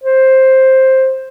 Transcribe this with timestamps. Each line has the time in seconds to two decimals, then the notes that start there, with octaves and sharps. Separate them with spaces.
0.04 C5